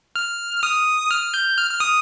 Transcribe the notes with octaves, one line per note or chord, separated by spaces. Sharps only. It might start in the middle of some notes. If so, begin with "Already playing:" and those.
F6
D#6
F6
G6
F6
F6
D#6